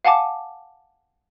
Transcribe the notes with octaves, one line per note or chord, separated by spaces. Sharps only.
F5 F#5 G#5 A5 D6